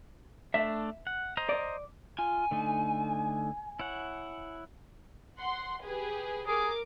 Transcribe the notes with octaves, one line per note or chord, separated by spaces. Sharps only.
A3 D4 E5
F#5
C5 D#5 A#5
D5
F4 G#5
D3 A3 D#4
E4 C#5 F#5
F#5 C6
G4 G#4 B4
G#4 A#4 D6